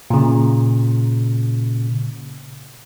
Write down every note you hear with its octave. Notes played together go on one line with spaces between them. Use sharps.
A#2 C#3